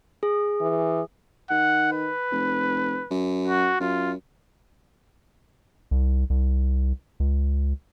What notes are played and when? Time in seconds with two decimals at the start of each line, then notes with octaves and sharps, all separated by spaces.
0.23 G#4
0.61 E3
1.51 D#3 F#5
1.92 B4
2.31 F1
3.11 F#2
3.48 F#4
3.80 F#2 F4
5.91 C2
6.30 C2
7.20 C#2